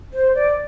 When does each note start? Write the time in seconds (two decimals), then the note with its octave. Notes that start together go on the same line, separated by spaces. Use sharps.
0.13 C5
0.35 D5